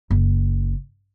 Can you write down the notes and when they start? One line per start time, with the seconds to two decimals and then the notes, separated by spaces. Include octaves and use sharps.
0.11 F#1